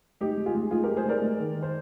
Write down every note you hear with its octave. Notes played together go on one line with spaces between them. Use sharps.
G#3 D#4 G4
G#3
F4 G#4
G#3
G#3 F4 G#4
G#3 G4 A#4
G#4 C5
G#3 A#4 D5
G#3
D#3
D#3
C5